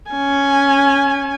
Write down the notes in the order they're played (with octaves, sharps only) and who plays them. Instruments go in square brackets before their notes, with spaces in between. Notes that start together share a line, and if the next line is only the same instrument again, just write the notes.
[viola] C#4 G#5